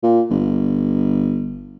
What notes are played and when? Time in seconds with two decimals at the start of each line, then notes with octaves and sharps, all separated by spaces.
0.03 A#2
0.30 G1